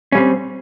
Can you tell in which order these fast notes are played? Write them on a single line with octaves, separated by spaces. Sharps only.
C#4 G3 C4